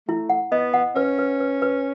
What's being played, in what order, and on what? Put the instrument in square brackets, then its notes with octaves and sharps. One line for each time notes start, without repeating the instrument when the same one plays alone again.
[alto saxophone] A3 [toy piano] E4
[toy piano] F#5
[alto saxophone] B3 [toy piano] D#5
[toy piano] F#5
[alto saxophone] C#4 [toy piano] B4
[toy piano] B4
B4
B4